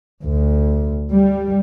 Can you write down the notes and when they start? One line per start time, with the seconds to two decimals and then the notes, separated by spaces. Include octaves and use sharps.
0.23 D2
1.11 G3